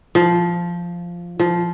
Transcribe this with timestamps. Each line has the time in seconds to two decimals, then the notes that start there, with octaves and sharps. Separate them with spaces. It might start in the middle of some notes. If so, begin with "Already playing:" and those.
0.15 F3
1.39 F3